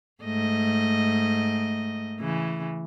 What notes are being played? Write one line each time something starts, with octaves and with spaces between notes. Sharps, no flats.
G#2 A3 D#5
C#3 E3